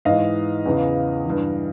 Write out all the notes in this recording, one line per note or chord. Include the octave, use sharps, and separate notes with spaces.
G#2 E3 D#5 F5
E2 C#3 E3
G2 E3